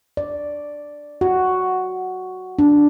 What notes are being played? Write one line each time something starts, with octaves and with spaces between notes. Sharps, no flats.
D5
F#4
D4